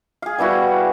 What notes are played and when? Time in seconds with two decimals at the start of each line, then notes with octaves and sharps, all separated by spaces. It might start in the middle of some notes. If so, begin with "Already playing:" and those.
0.22 G#4 F5
0.38 G3 B3 E4 F#4